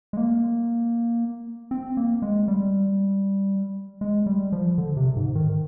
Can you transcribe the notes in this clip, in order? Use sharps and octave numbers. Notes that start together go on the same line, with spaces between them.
G#3
A#3
C4
A#3
G#3
G3
G#3
G3
F3
D3
C3
G#2
D#3